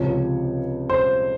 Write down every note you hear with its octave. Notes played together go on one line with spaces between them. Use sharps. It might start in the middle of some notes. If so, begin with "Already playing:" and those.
Already playing: C#2 C3 F3 C#5
C5